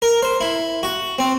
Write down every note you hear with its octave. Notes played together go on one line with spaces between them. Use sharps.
A#4
C5
E4
F#4
C4